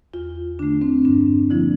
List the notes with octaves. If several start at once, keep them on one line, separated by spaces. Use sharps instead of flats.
E2 F4
D3 A3 D4
C4
G2 D4
D3 F3 A#3 E4